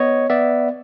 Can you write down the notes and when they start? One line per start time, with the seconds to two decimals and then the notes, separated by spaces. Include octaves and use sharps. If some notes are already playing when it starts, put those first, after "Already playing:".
Already playing: B3 C#5 D#5
0.30 B3 D5 E5